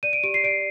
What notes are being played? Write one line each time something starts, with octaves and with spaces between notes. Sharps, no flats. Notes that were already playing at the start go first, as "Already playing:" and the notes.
D5 D#7
D7
G4 D7
C7
D5 D7